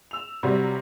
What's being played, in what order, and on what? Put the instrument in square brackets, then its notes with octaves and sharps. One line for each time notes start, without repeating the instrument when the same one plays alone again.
[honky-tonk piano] E6 F7
C3 F#3 G3